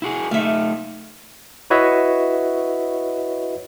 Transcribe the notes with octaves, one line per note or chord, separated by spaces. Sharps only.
E4 F#4 G#4
A3 D#4 E5 F5
E4 F#4 B4 C#5 D#5 E5